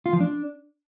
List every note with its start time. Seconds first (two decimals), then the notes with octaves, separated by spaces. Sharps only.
0.06 F4
0.13 F3
0.21 D4